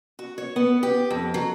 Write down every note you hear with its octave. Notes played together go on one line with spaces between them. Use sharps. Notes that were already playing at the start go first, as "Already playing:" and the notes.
F#4
C#5
B3
G4
F2
F#3